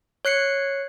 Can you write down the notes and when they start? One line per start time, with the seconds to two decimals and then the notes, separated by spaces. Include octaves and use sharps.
0.25 C#5 F#6 C7 C#7